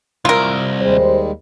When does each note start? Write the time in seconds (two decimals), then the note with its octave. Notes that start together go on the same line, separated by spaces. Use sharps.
0.25 C2 F4 A#4
0.81 D#2 G3 G#3 C5